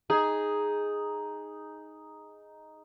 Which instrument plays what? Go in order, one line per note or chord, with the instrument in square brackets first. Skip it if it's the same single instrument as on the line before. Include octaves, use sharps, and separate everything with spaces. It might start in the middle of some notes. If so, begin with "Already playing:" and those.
[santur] D#4 [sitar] G#4